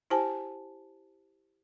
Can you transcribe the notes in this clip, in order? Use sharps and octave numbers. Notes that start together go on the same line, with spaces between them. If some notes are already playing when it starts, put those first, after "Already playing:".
E4 G4 C5 G#5 A5